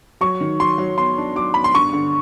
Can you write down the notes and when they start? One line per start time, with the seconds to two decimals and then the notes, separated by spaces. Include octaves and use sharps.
0.21 F#3 C#6
0.41 D#3
0.60 F#3 C6
0.78 F#3
0.97 B3 C6
1.18 D4
1.36 F#3 D6
1.54 B3 B5
1.64 C6
1.74 G2 C#6
1.93 D3